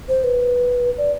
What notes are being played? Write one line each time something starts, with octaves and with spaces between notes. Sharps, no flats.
C5
B4
D5